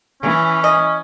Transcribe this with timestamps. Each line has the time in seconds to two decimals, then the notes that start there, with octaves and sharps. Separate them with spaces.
0.23 E3 C#4
0.64 D#5